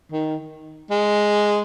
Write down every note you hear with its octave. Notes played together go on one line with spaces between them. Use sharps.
D#3
G#3